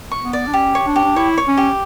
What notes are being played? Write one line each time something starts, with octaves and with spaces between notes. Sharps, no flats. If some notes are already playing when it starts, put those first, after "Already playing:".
C#6
B3
D5
D4
C#4 G4
C#5
D4
G4
D4
E4 C#5
C#5
C#4
G4